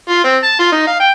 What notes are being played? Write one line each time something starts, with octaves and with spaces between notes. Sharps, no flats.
F4
C4
A5
F4
D#4
F5
G5